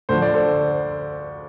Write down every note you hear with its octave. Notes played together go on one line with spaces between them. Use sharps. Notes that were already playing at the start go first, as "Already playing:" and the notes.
D2 D3 F3 C5
D5
A4 C5